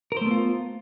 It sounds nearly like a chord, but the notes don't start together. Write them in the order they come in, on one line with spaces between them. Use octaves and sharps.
A#4 C5 A3 B3 F4